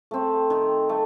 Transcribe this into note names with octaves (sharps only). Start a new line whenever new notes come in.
A3 C4
D#3
A3